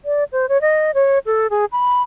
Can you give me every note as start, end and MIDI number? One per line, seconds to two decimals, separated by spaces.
0.05 0.24 74
0.32 0.49 72
0.49 0.60 73
0.61 0.91 75
0.94 1.19 73
1.26 1.47 69
1.50 1.65 68
1.72 2.02 83